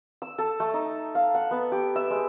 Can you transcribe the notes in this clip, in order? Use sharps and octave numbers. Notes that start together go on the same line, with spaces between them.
E6
A4
A3
D#4
F5
F#5
B3
G4
E5
G#3